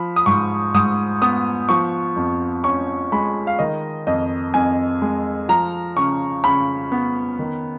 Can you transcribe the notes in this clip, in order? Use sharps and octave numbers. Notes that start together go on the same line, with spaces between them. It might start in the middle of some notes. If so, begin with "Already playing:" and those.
Already playing: F3 B5
D#6
G#2 C#6
G#2 D#6
B3 D#6
F3 C#6
F2
C#4 C#6
G#3 B5
F5
D#3 D#5
F2 D#5
F2 G#5
G#3
F3 A#5
C#3 C#6
C#3 B5
B3
D#3